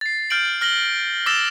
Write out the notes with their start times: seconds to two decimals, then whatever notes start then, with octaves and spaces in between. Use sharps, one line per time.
0.01 A6 C7
0.30 F6 G6 A6 D7 F#7
0.61 F6 A#6 F#7 G7
1.26 D6 E6 A6 A#6 E7 G7